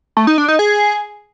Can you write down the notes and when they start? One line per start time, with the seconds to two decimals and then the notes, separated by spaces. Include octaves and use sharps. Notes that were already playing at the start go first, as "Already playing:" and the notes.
0.17 A3
0.27 D#4
0.38 D4
0.48 D#4
0.59 G#4